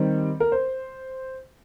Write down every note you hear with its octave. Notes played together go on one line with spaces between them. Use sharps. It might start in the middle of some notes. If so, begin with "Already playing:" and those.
Already playing: D#3 G3 C4
A#4
C5